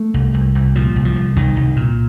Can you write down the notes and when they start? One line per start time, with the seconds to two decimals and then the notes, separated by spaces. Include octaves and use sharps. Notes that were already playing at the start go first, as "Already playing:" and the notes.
Already playing: A3
0.14 C2
0.34 C2
0.55 C2
0.75 A#2 F3
0.96 C2
1.05 F3
1.16 C2
1.36 C2 D#3
1.56 C2
1.76 A#2